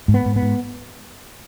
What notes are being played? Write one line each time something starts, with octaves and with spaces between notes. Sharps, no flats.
G#2
B3
G#2
B3
G#2